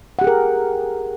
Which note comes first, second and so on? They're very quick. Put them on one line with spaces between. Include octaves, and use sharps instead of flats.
F#5 G4 G#4 A#4